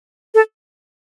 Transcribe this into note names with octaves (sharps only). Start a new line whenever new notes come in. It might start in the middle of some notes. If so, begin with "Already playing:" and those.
A4